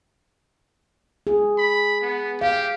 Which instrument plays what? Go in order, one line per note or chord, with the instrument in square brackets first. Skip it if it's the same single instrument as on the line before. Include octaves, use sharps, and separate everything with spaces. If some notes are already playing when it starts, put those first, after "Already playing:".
[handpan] G#4
[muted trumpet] B5
B3
[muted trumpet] G4 [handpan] F5